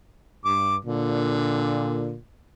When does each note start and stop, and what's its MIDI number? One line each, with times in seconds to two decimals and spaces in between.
0.45 0.77 43
0.45 0.76 86
0.85 2.17 46
0.85 2.13 50